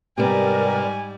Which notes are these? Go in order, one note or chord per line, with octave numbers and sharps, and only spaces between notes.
G#2 C3 G3 B3 A#4 D5 G#5